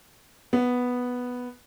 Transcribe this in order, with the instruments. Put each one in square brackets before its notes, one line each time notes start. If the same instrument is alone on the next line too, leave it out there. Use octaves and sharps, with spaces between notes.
[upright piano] B3